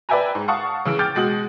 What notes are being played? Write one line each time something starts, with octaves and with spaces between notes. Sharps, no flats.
B4 D5 E5 G5 G#5 A#5
G#2
F5 F#5 A5 C#6 D#6
C#3 E3 E6 D7
G5 D6 F6 G6 A6 D7
B2 G#3 F#4 D#6 F#7